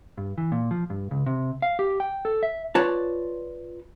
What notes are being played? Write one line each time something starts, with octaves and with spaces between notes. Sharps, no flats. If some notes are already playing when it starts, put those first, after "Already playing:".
G2
E3
A#2
F3
G2
C#2
C3
F5
G4
G5
A4
E5
F4 B4 C#5 D5 A5